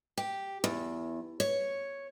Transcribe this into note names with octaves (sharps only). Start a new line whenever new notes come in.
G4
E2
C#5